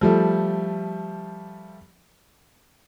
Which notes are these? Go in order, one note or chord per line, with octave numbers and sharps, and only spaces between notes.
F3 G3 A3